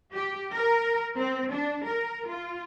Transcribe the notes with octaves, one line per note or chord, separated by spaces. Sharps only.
G4
A#4
C4
D4
A#4
F4